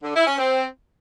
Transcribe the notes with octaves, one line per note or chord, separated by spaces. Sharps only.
D3
E4
C#4
C4